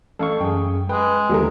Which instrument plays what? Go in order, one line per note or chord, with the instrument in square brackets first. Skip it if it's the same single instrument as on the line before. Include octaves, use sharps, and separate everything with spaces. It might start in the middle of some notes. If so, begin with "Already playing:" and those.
[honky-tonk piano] A1 [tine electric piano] A4 F5 C#6
[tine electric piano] F#2 G#4 [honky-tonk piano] G5
[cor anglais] G#3 [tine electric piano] B4 [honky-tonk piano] G5
[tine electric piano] D#2 D3 F#3 [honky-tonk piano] G3 A3 A#4